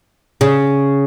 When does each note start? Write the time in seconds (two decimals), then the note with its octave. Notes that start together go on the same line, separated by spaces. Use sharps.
0.41 C#3